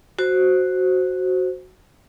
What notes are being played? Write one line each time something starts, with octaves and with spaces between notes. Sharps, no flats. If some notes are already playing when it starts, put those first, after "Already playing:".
F#4 C5